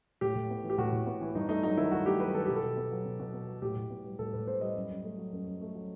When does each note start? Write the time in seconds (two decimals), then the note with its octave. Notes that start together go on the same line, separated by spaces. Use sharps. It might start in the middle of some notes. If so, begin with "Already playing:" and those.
0.21 A2 G4
0.36 A2
0.50 B3
0.64 E3
0.70 G4
0.78 A2 F#4
0.92 A2
1.07 B3
1.21 E3
1.35 G2 D#4
1.49 A3 D#4
1.63 F#3 D#4
1.77 D#3 E4
1.91 G2 F#4
2.06 A3 G4
2.20 F#3 B4
2.34 D#3 A4
2.45 B2 G4
2.56 A4
2.63 B2
2.77 B3
2.91 F#3
3.06 B2
3.20 B2
3.33 B3
3.47 F#3
3.62 A2 G4
3.76 A2
3.90 B3
4.05 G3
4.19 A2 A4
4.33 A2 B4
4.47 B3 C5
4.61 G3 D#5
4.76 F#2
4.90 F#2
5.04 A3
5.18 F#3
5.33 F#2
5.47 F#2
5.61 A3
5.75 F#3